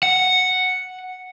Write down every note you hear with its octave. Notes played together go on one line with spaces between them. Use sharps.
F#5